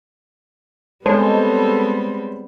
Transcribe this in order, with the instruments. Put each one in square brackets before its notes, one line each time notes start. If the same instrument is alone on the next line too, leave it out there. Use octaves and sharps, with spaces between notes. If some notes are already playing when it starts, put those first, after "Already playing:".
[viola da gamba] G3 B3 C4 [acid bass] G#3 [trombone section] A4 [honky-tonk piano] C5 C#5 A5